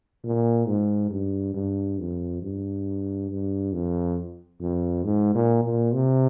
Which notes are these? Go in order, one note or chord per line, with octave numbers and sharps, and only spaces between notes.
A#2
G#2
G2
G2
F2
G2
G2
F2
F2
G#2
A#2
A#2
C3